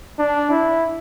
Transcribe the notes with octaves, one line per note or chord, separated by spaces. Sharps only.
D4
E4